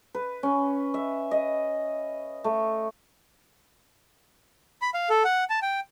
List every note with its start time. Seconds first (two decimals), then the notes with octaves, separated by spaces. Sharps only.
0.14 B4
0.43 C#4
0.94 E5
1.31 D#5
2.44 A3
4.82 B5
4.94 F5
5.10 A4
5.24 F#5
5.50 A5
5.62 G5